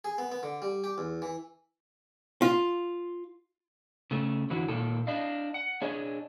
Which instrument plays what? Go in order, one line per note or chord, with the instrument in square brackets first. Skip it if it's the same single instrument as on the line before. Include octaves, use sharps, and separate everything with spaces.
[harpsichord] G#4
B3
B3
D3
G3
G4
E2
E3
[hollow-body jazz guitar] F4
[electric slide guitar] C#3 A3
F2 D3 E3 F#3 F#4
A#2 D#3 A#3 A4
D4 D#5 F5
F#5
D4 G#4 C#5 D#5